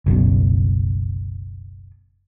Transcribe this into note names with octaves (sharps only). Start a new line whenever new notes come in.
F#1 C2 F#2 B2